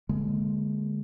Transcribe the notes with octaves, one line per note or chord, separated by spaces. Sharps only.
D3 G#3 A#3